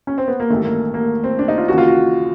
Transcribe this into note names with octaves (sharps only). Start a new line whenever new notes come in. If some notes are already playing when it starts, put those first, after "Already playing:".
C#4
C4
B3
A#3
A1 G2 D#3 A3
A#3
A#3
C4
D4
D#4
F4
D#2 C#3 E3 F#4
F4
F#4